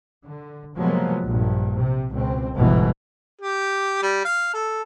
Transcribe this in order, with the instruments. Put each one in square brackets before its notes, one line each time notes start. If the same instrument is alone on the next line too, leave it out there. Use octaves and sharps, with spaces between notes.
[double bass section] D3
C3 F3 F#3 G#3 A#3 B3
A#1 G2
C3
C#2 B2 C4
G1 C#2 G#2 B2 E3
[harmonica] G4
G3
F5
A4